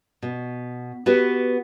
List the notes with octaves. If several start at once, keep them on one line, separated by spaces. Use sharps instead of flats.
B2
B3 F#4 G4 B4